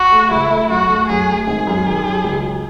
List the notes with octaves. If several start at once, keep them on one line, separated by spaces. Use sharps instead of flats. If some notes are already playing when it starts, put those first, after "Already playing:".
Already playing: F#4
A3
C#2 E4
A3
F#2 F#4
A3
F#2 G#4
A3
G#1 G#4
F#2
D#3
F#2
C#2
F#3